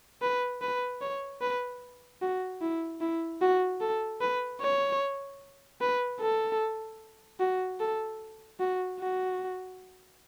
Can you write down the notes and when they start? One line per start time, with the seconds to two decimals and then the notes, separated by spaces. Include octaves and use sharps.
0.22 B4
0.62 B4
1.01 C#5
1.41 B4
2.22 F#4
2.62 E4
3.01 E4
3.41 F#4
3.81 A4
4.21 B4
4.61 C#5
5.81 B4
6.20 A4
7.40 F#4
7.80 A4
8.60 F#4
9.00 F#4